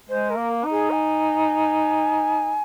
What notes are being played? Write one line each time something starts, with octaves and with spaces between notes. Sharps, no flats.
G#3 C5
A#4
A#3
D#4
G#4
G#5